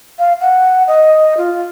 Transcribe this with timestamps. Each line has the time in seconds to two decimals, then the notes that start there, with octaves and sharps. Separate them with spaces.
0.19 F5
0.41 F#5
0.87 D#5
1.38 F4